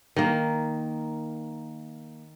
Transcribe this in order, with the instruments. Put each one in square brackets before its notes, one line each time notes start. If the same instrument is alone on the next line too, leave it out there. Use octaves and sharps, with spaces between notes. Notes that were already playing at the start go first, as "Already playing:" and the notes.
[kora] D#3 A#3